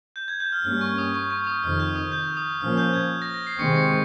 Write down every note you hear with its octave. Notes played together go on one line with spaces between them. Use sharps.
G6
G#6
G6
F6
G2 G3 A#3 C#4 F6
C#6
D#6
C#6
C#6
D#6
F2 C3 D#3 F6
G6
D#6
G6
D#6
A#2 F3 A#3 C#4 F6
G6
G#6
A#6
A#6
C7
C3 D#3 G#3 C4 C#6 C#7
C#6 C#7